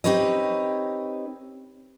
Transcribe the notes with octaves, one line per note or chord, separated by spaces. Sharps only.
C4 D#4 G4 B4 C#5 D#5